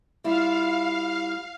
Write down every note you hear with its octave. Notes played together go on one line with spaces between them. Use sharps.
G3 E4 F4 F5